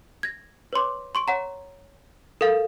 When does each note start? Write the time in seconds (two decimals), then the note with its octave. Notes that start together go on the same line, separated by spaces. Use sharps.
0.23 G#6 A#6
0.73 B4 C#5 C6 D6
1.15 C6 C#6 D7
1.28 C#5 F#5 A#5
2.41 A4 A#4 F5 A6